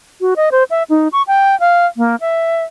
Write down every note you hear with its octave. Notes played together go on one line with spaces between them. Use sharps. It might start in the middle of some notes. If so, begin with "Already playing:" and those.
F#4
D#5
C5
E5
D#4
C#6
G5
F5
A#3
E5